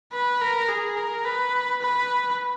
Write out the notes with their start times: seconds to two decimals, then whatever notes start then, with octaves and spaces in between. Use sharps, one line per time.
0.13 B4
0.42 A#4
0.69 G#4
0.97 A#4
1.25 B4
1.82 B4